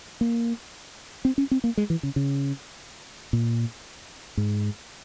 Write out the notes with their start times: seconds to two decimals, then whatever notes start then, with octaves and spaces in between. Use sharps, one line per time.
0.21 A#3
1.25 C4
1.38 C#4
1.51 C4
1.64 A#3
1.77 G#3
1.90 E3
2.03 C#3
2.16 C#3
3.33 A#2
4.37 G#2